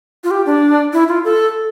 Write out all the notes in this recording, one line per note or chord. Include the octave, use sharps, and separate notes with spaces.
F4
G4
D4
E4
F4
A4